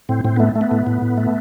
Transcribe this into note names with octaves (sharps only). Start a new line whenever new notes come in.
A2 C4
A2 C4
A3 B3
A3
B3
A2
A2
A2
A3